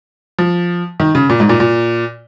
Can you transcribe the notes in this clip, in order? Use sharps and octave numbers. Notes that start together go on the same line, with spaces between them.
F3
D#3
C#3
A#2
G#2
A#2
A#2